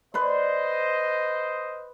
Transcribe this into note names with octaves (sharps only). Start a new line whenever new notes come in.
B4 C5 D5 D#5 C6